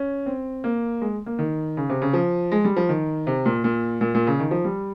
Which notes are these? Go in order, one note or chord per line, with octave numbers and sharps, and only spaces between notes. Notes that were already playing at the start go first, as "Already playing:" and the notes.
Already playing: C#4
C4
A#3
G#3
A#3
D#3
C#3
C3
C#3
F3
G#3
G3
F3
D#3
C3
A#2
A#2
A#2
A#2
C#3
D#3
F3
G3